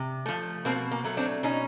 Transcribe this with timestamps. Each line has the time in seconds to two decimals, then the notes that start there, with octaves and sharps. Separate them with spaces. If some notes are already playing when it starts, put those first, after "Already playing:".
Already playing: C3
0.26 F3 A3
0.65 B2 A#3 C4
0.92 A#3
1.04 F#3 A3
1.17 C4 D4
1.43 B2 C#4 D#4